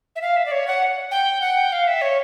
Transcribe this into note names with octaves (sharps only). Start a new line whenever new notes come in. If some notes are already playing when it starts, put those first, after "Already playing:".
E5
F5
E5
D5
C#5
F#5
G5
F#5
G5
F5
E5
C#5